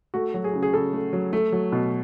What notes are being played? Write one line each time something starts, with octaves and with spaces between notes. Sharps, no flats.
A3 F#4
F#3
G#4
C#3
G#4
C#3 A4
A3
F#3
A3
F#3
B2